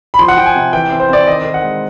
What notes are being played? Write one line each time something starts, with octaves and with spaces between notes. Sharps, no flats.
B5
F3 C6
F#5
F3 G5
G#5
C3
E3 G5
C4
C5
C4 D5
D#3 D#5
D#3
F#5
G#3